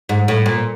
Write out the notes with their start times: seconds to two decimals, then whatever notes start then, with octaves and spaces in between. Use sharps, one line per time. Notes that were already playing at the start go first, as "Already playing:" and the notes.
0.09 G#2
0.28 A2
0.46 A#2